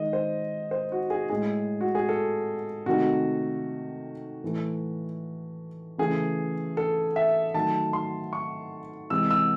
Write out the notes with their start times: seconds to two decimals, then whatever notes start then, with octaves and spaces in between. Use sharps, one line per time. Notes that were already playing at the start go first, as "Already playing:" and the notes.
Already playing: D#3 G#3 D#5
0.13 C5
0.71 C5
0.92 F#4
1.10 G#4
1.30 A2 G#3 G#4
1.81 F#4
1.95 G#4
2.09 A4
2.86 C3 D#3 A3 F#4
4.43 A2 E3 A3
5.98 C#3 E3 A3 G#4
6.77 A4
7.16 E5
7.54 D#3 F#3 A3 A5
7.93 C6
8.33 C#6
9.10 C3 E3 G#3 E6
9.31 E6